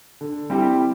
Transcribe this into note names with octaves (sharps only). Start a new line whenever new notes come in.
D3
G3 C4 E4 G4